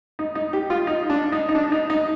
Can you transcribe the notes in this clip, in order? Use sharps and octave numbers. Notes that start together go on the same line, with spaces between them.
D#4
D#4
G4
F4
D#4
D4
D#4
D#4
D4
D#4
D#4